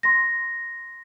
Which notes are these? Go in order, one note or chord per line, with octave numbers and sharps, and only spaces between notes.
C6 A#6